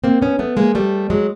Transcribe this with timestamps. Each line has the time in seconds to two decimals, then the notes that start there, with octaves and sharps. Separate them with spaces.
0.04 A#3 C4
0.22 B3 C#4
0.39 A3 B3
0.57 G#3 A#3
0.75 G3 A3
1.10 F#3 G#3